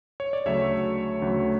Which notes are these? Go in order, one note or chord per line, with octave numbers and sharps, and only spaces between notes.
C#5
D5
D2 C#3 F#3 A3 C#5 E5
D2 C#3 F#3 A3